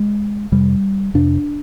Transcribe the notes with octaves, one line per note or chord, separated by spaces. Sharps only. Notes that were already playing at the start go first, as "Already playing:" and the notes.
Already playing: G#3
F2 C3 G3
F2 C3 D4